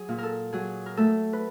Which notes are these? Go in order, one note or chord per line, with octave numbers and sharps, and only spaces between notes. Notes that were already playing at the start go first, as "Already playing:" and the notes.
Already playing: F#3 G#4
A#2
A4 A#4
F#3 G#4
A#4
A3 A4
B4